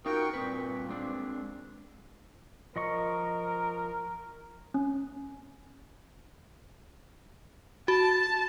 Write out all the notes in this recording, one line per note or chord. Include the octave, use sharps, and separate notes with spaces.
D#4 F4 F#4 A#4 G5 C#6
G2 A#2 C4 B4
G#3 C4 D4
F3 A#4 D#5 C#6
C#4
F#4 A5